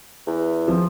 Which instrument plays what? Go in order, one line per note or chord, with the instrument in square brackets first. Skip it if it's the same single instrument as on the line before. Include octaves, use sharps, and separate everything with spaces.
[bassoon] E2
[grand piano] F3